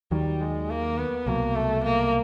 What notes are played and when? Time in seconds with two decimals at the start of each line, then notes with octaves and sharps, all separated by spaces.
0.11 D#2 D#3 F#3 G3
0.41 G#3
0.70 A#3
0.98 B3
1.26 C2 B2 F#3 A#3
1.55 A3
1.84 A#3